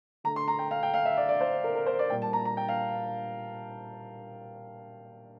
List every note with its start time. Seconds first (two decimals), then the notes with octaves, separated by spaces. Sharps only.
0.24 D3 A3 A#5
0.36 C6
0.48 A#5
0.59 G5
0.71 F5
0.83 G5
0.94 F5
1.05 E5
1.17 D5
1.29 D5
1.41 C5
1.64 A#4
1.75 A#4
1.86 C5
1.99 D5
2.10 A#2 G3 G5
2.22 A5
2.33 A#5
2.45 A#5
2.57 G5
2.68 F5